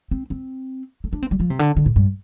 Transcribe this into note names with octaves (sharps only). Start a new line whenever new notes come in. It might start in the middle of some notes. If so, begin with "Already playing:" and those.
C4
C4
A3
D4
C4
G3
F3
C3
D3
D3
A2
G2